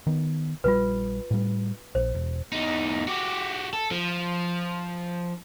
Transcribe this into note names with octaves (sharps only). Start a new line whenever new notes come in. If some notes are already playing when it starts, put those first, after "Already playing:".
D#3 B3
A#1 D3 G3 F4 B4
A2 G3
A#1 C5
E1
E2 D#4
F#4 G4
A4
F3